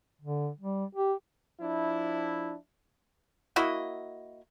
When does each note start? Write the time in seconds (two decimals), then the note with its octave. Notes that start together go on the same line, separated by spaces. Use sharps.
0.22 D3
0.59 G3
0.95 G4
1.60 F3 D4 E4
3.56 A#3 E4 F#4 D#5